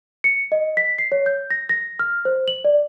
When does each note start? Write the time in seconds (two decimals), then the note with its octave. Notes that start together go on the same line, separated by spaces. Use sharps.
0.24 C#7
0.52 D#5
0.77 B6
0.98 C7
1.12 C#5
1.26 G6
1.51 A#6
1.69 A#6
1.99 F6
2.25 C5
2.48 F#7
2.64 D5